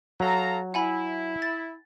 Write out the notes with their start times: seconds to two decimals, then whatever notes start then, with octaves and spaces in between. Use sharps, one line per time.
0.20 F#3 A4 F5 A#5
0.74 E4 F#5 G#5 B5
1.42 A6